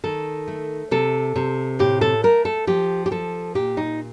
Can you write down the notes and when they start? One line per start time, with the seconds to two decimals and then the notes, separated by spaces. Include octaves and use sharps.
0.04 D#3 A4
0.48 A3
0.91 C3 A4
1.36 C3
1.79 A2 G4
2.01 A4
2.23 A3 A#4
2.45 A4
2.67 F3 G4
3.06 G4
3.11 F3 A4
3.55 A#2 G4
3.77 D#4